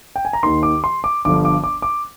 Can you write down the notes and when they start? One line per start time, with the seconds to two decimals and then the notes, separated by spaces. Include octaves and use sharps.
0.16 G5
0.25 G#5
0.33 A#5
0.43 D#2 D#3 C6
0.63 D6
0.84 C6
1.04 D6
1.25 G1 G2 D3 F3 D6
1.45 D6
1.64 D6
1.82 D6